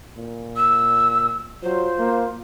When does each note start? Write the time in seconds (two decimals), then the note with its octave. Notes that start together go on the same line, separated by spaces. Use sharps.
0.18 A#2
0.56 E6
1.63 F#3 F4 C5
1.99 A#3